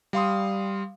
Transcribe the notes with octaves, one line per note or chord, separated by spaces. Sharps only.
G3 F5 C6 D#6